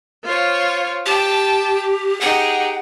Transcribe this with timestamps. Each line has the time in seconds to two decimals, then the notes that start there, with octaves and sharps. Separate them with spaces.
0.24 F4 C5 C#5
1.06 G4 G5 A5
2.21 D#4 G4 G#4 F#5